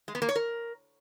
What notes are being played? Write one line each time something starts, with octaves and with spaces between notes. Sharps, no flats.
G#3
B3
A#3
C#5
A#4